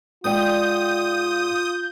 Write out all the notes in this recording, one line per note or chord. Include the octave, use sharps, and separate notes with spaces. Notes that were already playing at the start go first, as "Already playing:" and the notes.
G#2 F4 D5 G5 D#6 G6